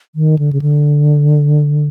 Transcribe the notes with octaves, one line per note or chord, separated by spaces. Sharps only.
D#3
D3
C#3
D3